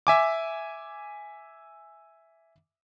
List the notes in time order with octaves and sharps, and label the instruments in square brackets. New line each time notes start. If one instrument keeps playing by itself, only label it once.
[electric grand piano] E5 G#5 D6